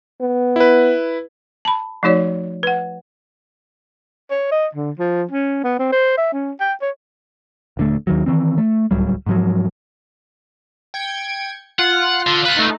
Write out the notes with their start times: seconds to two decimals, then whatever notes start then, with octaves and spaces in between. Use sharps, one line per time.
0.21 B3
0.56 E4 B4
1.65 A5 B5
2.03 F3 A3 D#4 F#4 C#5 D5
2.63 B4 F#5
4.30 C#5
4.51 D#5
4.75 D3
4.99 F3
5.31 C#4
5.63 B3
5.79 C4
5.92 C5
6.18 E5
6.33 C#4
6.60 G5
6.82 C#5
7.77 D#1 D3 A3
8.07 D#2 D#3 F#3
8.26 D#3 E3 C4
8.58 A3
8.91 D1 C#2 F#3 G3
9.27 G#2 F3 F#3
10.94 G5 G#6 C#7
11.79 F4 F#5 F6
12.27 D3
12.45 F4 B4 F#6
12.57 A3 D#4